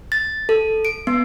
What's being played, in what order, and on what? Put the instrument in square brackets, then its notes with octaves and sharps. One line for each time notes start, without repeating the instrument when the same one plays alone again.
[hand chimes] A6
A4
D7
B3